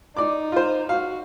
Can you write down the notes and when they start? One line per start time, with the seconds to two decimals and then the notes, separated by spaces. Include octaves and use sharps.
0.17 D#4 D5 D6
0.52 F4 C5
0.89 F#4 F5